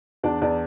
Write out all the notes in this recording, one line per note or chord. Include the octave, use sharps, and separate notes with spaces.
E2 D4 D5
E2 D4 D5